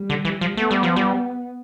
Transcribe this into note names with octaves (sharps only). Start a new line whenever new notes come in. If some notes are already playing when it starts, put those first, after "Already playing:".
Already playing: G3
D3
E3
F3
A3 B3
G3
F3
G3